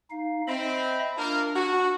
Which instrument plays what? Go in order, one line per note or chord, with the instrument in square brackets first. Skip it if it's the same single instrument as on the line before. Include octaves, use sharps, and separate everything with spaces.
[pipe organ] D#4 F5
[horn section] C4 [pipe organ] D#5 E5 B5
[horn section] A#3 F4 A#4 [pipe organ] D4
[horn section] F#4